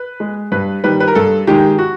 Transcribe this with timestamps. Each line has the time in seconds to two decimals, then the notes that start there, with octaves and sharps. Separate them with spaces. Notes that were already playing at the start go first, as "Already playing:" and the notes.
Already playing: B4
0.20 G#3
0.52 G2 B4
0.84 D#3 G3 B4
1.00 B4
1.08 A#4
1.15 G2 A4
1.47 D#3 G#3 G4
1.78 F#4